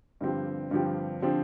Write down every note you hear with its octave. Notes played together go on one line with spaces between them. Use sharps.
G2 D3 F3 C4 G4
G2 D3 F3 C4 G4
D3 F3 C4 G4